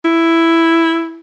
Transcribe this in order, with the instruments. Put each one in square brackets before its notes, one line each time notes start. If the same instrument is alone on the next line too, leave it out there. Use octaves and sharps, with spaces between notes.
[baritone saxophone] E4